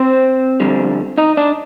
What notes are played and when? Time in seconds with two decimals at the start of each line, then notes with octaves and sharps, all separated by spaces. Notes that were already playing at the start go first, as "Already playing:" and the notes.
Already playing: C4 C5
0.60 F2 D3 G3
1.18 D#4 D#5
1.37 D4 D5